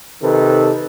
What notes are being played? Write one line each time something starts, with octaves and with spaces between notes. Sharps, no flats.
C3 D#3 A4 B4